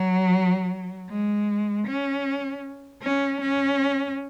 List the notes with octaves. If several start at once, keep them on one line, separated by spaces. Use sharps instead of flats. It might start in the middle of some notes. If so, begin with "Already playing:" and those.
Already playing: F#3
G#3
C#4
C#4
C#4